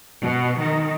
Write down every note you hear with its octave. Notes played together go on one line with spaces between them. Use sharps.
B2
D#3